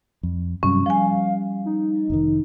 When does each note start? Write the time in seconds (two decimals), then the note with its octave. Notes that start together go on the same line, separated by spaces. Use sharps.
0.23 F2
0.63 G2 C3 F#3 C#4
0.86 F3 G3 F5 G#5
1.66 D#4
2.10 F1 B2 D#3